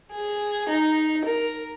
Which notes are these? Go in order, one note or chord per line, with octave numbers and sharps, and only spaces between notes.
G#4
D#4
A#4